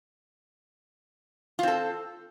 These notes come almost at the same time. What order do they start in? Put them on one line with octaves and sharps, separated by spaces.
F4 C4 A4